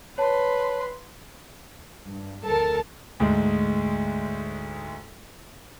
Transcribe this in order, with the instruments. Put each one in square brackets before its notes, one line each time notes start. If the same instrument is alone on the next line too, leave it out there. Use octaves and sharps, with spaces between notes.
[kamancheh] B4 C6 [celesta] C#5 A5
[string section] G2
D2 A4 A#4 A5
[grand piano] D2 G#2 G#3